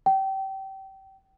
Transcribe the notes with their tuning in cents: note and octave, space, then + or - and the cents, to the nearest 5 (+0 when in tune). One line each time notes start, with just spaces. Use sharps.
G5 -25